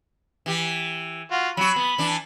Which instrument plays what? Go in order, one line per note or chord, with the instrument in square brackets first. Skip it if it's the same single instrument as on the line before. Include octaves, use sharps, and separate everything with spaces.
[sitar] E3 G4
[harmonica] F4 F#4
[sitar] F#3 F#4 [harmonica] B5
[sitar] B3
E3 D4